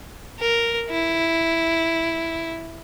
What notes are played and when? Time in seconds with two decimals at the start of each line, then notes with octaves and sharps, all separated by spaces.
0.40 A#4
0.90 E4